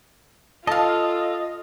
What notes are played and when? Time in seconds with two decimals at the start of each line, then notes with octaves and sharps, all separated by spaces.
0.67 F4 A4 D#5 F5 A5